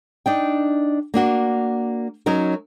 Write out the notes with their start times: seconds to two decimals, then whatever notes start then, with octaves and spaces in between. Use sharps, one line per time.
0.26 D4 D#4 G5
1.14 A#3 D4 F#4
2.26 F#3 C#4 D#4 A#4